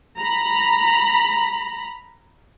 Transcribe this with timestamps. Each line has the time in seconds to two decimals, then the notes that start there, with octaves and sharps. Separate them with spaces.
0.19 A#5 B5